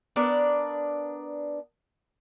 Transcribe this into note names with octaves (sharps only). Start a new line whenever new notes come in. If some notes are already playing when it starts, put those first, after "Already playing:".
B3 D4 A#4 D5